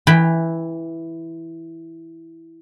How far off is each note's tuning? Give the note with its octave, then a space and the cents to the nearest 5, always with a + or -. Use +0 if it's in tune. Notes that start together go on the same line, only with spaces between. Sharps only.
E3 +0 G5 +20 B5 +0